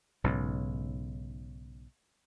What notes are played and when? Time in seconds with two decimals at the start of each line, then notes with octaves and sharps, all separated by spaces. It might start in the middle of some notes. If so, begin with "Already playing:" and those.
0.24 B1 G#2 C#3